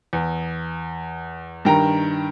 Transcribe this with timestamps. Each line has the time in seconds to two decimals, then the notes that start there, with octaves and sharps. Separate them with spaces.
0.13 E2
1.65 G2 D#3 G5 A#5